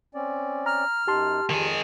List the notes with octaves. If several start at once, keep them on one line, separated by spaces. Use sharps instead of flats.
C4 C#4 D5
A#5 F6
F#2 D#4 G4 A5 C6
F2 D#3 G#4